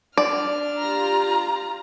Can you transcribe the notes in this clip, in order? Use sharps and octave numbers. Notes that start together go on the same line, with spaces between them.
D4 D5 F6
F4 G4 A#5